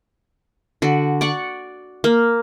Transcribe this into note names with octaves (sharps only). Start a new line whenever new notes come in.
D3 F#4
D5 F#5 C#6
A#3